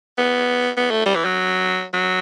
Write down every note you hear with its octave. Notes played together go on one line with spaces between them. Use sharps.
B3
B3
A3
G3
E3
F#3
F#3